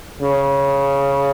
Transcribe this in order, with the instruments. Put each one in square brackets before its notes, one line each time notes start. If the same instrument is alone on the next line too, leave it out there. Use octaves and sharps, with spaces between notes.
[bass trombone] C#3